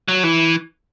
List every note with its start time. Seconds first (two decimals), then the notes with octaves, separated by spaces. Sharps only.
0.08 F#3
0.24 E3